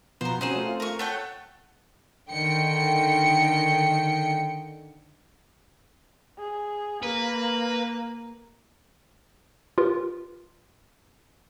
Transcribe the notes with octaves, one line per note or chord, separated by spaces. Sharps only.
B2 F3 B3 C5 A#5
C4 C#4 D#4 F#4 G#4 C5
A3 C4 F4
A#4 C#6
A3 C#5 F#5 G5 A5
D3 D#3 G5 C#7
G#4
A#3 B4
F4 G4 G#4 A#4 B4